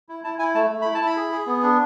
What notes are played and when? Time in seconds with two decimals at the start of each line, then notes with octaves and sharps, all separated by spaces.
0.09 E4
0.24 E4 A5
0.39 E4 G#5
0.55 A3 A5
0.70 A3
0.82 E4 B5
0.95 A5
1.01 E4 B5
1.17 G#4
1.32 G#4
1.47 B3
1.63 D4